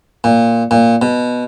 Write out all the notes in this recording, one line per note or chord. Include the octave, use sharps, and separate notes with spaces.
A#2
A#2
B2